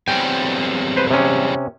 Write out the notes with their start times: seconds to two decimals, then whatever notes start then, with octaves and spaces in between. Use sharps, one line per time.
0.08 E2 F#3 G3 C4 G5 G#5
0.97 B4 C5
1.11 C3 C#4